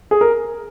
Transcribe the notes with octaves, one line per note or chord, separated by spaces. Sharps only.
G#4
A#4